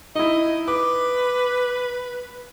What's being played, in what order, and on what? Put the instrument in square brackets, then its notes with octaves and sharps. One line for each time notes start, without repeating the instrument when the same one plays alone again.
[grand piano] D#4 E4 [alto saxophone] D#5
[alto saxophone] B4 [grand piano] D6